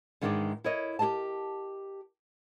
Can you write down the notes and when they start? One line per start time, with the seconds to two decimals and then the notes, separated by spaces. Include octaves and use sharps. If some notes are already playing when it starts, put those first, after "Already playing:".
0.22 G#2 D#3 E3 G#3 D4 D5
0.64 E4 A#4 C#5 D#5
0.99 G4 G#4 A#4 D#5 A5